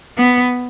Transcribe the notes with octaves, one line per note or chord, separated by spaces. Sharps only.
B3